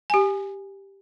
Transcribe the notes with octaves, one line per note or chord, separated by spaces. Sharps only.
G4 G#5